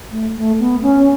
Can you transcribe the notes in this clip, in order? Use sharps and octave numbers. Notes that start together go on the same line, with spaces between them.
A3
A3
B3
C#4